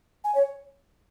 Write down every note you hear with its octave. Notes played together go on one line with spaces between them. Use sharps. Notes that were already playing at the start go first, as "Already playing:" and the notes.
G#5
C#5